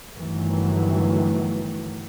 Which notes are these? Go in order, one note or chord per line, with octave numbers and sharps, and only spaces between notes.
G1 D#3 E3 F#3 A3